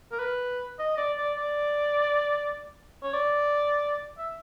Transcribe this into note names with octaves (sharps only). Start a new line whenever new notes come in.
A#4
B4
D#5
D5
D5
D5
C#5
D5
E5